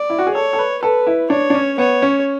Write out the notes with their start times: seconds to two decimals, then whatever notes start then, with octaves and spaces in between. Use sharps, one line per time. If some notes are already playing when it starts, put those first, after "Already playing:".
Already playing: D5
0.10 E4
0.18 F#4
0.27 G#4
0.34 A4 C#5
0.53 A4
0.59 B4
0.83 A4 B4
1.07 E4
1.30 D4 C#5
1.50 D4
1.54 C#4
1.78 B3 C#5
2.02 C#4